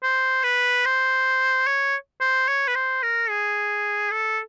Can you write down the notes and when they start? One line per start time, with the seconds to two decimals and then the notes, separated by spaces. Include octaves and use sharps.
0.03 C5
0.43 B4
0.85 C5
1.67 C#5
2.21 C5
2.48 C#5
2.68 B4
2.75 C5
3.03 A#4
3.29 G#4
4.11 A4